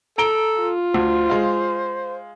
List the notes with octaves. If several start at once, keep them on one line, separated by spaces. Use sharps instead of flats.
A4 A#5 D7 G7
F4
D2 C5
G#3 F5